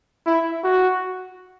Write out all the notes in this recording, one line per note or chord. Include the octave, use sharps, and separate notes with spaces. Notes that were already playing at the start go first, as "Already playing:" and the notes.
E4
F#4